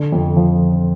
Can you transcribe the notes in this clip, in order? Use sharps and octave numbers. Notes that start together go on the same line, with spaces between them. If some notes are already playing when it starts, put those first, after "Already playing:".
Already playing: D3
F2
F3